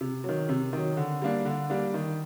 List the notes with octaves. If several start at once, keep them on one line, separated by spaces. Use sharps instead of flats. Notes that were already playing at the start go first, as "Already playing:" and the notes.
C3
D#3 F#3
C3
D#3 F#3
D3
G3 A#3 D4
D3
G3 A#3 D4
D#3